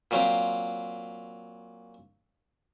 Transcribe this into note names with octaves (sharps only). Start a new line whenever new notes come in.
A#2 F#3 C4